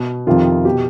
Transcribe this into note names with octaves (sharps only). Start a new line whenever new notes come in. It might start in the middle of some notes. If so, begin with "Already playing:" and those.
Already playing: B2
F2 C3 D#3 F4
B2 G4